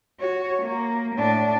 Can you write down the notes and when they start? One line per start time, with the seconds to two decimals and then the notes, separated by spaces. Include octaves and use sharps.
0.20 F#4 C#5
0.63 A#3
1.16 A2 D4